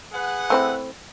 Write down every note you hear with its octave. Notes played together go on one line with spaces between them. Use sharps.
G#4 B4 F#5
A3 C4 E4